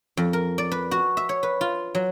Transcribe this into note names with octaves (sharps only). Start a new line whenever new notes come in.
F2
A#4
D5
B4
F#4
E5
C#5
B4
F4
F#3